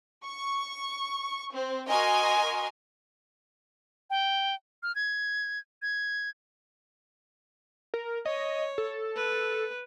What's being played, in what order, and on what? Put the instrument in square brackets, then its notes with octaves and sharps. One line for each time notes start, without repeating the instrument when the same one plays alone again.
[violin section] C#6
C4
F#4 A#4 D#5 G#5 C6
[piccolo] G5
F6
G#6
G#6
[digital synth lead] A#4
[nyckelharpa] C#5 [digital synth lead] D#5
[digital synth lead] A4
[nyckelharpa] B4